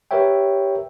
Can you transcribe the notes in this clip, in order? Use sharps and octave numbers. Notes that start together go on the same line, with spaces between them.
G4 A#4 B4 C#5 E5 G5